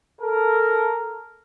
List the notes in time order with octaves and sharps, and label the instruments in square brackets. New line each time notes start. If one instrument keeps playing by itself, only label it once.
[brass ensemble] A4 A#4